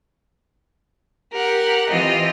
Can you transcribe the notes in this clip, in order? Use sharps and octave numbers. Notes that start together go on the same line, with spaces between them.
G4 A#4 F#5
E3 C4 F4 G4 D#5